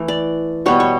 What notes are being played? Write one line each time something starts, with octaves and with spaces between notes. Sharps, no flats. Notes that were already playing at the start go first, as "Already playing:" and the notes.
Already playing: E3 A3
D5
B2 G3 B3 C#5
C#5